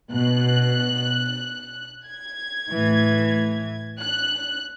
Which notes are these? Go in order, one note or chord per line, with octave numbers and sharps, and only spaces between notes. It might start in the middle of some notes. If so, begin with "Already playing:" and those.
B2 F#6
G#6
A2 E3
F#6